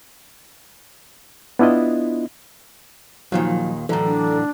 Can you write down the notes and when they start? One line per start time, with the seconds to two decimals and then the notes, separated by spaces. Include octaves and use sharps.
1.59 B3 D4 E4 F4 D#5
3.32 D#2 A#2 D#3 F3 F#3
3.89 A2 D3 E3 F#3 A4 A#5
4.06 D4